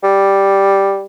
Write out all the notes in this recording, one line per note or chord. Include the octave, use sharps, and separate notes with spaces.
G3